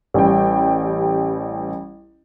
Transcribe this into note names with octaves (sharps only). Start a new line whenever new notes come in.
A1 G3 G5